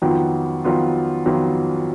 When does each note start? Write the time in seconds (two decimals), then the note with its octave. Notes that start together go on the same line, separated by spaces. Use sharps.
0.02 F2 D#3 F#3 B3 F4
0.65 F2 D#3 F#3 B3 F4
1.26 F2 D#3 F#3 B3 F4